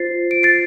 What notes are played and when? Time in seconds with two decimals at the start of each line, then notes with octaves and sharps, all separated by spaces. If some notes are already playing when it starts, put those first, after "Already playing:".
Already playing: F4 C5 A6 C7
0.31 D7
0.43 A6 C7